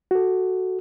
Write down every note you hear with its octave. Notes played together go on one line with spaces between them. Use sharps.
F#4 A4